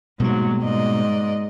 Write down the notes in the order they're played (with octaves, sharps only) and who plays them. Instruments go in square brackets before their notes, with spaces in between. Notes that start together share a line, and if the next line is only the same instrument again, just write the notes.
[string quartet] G#2 F#3 [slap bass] B2 G3 A#3
[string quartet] G#2 D5 D#5